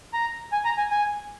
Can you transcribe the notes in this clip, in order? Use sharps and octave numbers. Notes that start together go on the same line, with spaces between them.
A#5
G#5
A#5
G#5
G#5